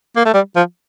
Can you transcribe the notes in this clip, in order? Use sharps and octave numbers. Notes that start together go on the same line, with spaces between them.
A#3
A3
G3
F3